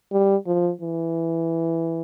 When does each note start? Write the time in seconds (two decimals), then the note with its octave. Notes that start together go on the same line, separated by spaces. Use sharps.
0.12 G3
0.46 F3
0.81 E3